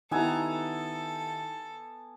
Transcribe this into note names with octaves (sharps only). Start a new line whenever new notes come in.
D#3 B3 E4 G4 A4 G#5 A#5 E6
A4